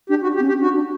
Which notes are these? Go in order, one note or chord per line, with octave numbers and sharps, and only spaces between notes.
D4 G4
F#4
D4
G4
C4
C#4
G4
D4 F#4
D4